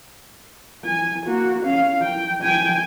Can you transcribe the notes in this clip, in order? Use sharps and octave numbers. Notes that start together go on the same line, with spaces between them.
G#5
A#3 F#4
C#4 F5
G5
G5 G#5